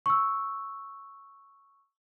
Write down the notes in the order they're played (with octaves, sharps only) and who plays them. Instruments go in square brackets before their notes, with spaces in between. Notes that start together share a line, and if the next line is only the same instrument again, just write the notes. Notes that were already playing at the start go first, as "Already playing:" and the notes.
[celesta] C#6 E6